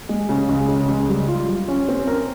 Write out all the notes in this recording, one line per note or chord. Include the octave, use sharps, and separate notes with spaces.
G#3
C#3
C#2
C#3
C#2
G3
F4
G3
C#4
C4
A#4